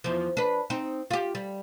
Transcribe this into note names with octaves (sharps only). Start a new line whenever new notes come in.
E2 F3
D4 B4
C4 D#4
F4 G4
G3